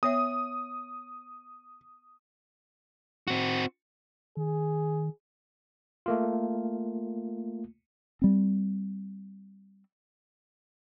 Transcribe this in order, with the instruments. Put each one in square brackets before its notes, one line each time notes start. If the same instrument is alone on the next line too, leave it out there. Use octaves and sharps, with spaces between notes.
[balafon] B3 C#5 E5 [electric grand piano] D#6
[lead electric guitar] C4 F#4
[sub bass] D#3 [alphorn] G#4
[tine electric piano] A3 A#3 F4
[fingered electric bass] G3 C4